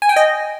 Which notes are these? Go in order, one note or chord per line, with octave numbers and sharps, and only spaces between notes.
G#5
G5
D#5